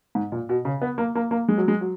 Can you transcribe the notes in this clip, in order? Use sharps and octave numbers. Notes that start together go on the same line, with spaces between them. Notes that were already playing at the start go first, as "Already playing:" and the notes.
G#2
A#2
B2
C#3
B3
A#3
A#3
A#3
G#3
F#3
G#3
F#3